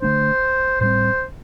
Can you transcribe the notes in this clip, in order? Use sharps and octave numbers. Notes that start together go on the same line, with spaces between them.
D3 A3 D4 C5
A2 G3 C4 C5